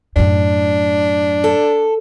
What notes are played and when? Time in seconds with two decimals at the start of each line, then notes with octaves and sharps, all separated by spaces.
0.16 F#2 A2 D4
1.44 A4